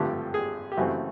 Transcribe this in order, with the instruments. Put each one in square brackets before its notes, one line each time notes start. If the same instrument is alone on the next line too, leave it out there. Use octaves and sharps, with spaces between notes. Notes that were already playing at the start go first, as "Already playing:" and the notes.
Already playing: [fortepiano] G#1 G2 D3 F3 A3 G4
G#4
G4
F#2 C#3 E3 A3 C4 F#4